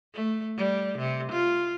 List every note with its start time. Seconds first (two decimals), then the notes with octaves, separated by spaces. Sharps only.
0.14 A3
0.57 G3
0.98 C3
1.32 F4